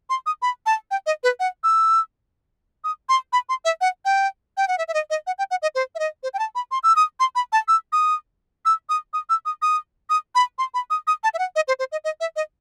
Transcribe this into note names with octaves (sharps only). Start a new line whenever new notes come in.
C6
D#6
B5
A5
G5
D#5
B4
F#5
E6
D#6
C6
B5
C6
E5
F#5
G5
G5
F#5
E5
E5
D#5
D#5
F#5
G5
F#5
D#5
C5
E5
D#5
C5
G5
A5
B5
C6
E6
D#6
C6
B5
A5
E6
D#6
E6
D#6
D#6
E6
D#6
D#6
D#6
B5
C6
B5
D#6
D#6
A5
E5
F#5
D#5
C5
C5
D#5
D#5
E5
D#5